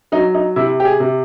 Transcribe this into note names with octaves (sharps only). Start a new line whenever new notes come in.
F#3 D#4
D#4
C3 E4
G4
G#4
C3